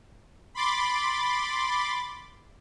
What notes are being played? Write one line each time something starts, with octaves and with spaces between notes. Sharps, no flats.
B5 C6 D6 A6